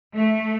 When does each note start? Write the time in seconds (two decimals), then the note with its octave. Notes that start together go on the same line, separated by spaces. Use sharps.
0.16 A3